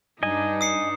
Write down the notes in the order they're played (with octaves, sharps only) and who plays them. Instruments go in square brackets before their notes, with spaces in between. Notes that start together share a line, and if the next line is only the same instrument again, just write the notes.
[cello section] G2 [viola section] D4 D#4 [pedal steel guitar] D#5 G#5
[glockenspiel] D#6 C7 C#7